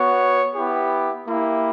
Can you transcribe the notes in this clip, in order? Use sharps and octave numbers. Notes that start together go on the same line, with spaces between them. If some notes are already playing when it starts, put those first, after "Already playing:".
Already playing: B3 F#4 C#5
B3 E4 G4
A#3 E4 G4